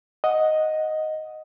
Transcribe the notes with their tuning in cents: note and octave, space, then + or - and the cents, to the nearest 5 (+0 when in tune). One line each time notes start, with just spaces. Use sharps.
D#5 +0 F#5 -10